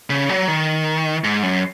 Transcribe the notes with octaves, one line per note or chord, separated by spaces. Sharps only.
C#3
F#3
D#3
G#2
F#2